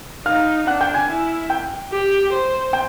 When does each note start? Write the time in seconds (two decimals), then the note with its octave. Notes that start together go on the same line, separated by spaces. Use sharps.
0.26 D#4 F5 F6
0.67 D4 F#5 F#6
0.81 G5 G6
0.94 G#5 G#6
1.09 E4
1.50 G5 G6
1.91 G4
2.32 C5
2.73 G5 G6